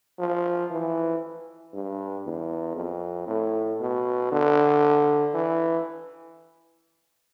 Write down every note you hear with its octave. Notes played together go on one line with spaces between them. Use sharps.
F3
E3
G2
E2
F2
A2
B2
D3
E3